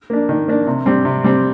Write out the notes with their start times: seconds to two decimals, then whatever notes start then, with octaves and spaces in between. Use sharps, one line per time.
0.10 A#3 D4
0.29 D#3
0.48 A#3 D4
0.67 C3
0.86 G3 C4
1.05 C3
1.24 G3 C4